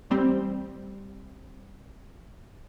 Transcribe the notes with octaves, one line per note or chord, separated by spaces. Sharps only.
A1 G3 C4